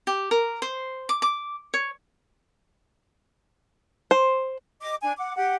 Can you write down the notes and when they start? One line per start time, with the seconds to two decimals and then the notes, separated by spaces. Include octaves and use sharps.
0.07 G4
0.31 A#4
0.62 C5
1.09 D6
1.22 D6
1.74 C#5
4.11 C5
4.81 D#5 D6
5.02 D4 G#5
5.17 F#5 D6
5.36 G4 F#5